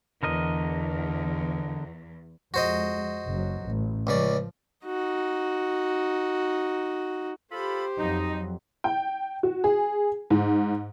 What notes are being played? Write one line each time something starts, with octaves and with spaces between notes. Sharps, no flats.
E2 D3 A#4 D#5
F2 G#3 F#4 C5 D#5
F#1 F#3
A1
C#2 C#3 F3 D5
D#4 F#4
F4 G4 A4 C5 B5
F2 F#3 D#4
G5
F#4
G#4
G#2